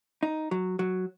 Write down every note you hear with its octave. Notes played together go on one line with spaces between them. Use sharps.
D#4
F#3
F#3